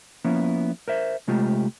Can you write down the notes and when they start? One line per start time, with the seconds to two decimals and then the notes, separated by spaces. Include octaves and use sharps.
0.25 F3 A#3 B3 C#4 E4
0.88 A#4 C5 E5
1.28 C3 G#3 A3 F4 G4